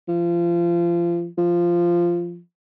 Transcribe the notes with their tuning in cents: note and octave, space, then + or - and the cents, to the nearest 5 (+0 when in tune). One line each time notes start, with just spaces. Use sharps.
F3 -30
F3 -10